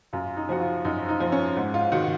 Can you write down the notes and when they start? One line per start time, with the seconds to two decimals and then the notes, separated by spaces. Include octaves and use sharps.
0.13 F#2 F4
0.37 D#4
0.49 F3 F#4
0.60 F4
0.85 F#2 D#4
1.08 D#4
1.20 F3
1.32 C#4
1.56 G#2
1.74 F4
1.92 D#3 F#4